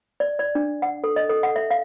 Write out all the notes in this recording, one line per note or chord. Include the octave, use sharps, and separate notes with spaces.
D5
D5
D4
F#5
A4
D#5
A4
F#5
E5
F5